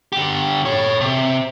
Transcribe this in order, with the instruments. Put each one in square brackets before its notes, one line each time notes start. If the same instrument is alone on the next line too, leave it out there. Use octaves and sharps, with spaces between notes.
[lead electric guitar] D3 G4
A4 C#5
C3